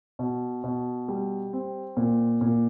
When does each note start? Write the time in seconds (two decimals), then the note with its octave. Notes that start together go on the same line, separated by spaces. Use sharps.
0.19 B2
0.64 B2
1.08 G3
1.53 C4
1.97 A#2
2.41 A#2